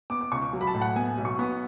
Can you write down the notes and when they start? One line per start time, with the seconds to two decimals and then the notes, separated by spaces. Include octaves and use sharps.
0.10 B3 D6
0.21 D6
0.32 C#2 C#6
0.53 F#3
0.61 B5
0.67 A5
0.74 A2
0.81 F#5
0.96 B3 G#5
1.18 B1
1.25 C#6
1.39 B3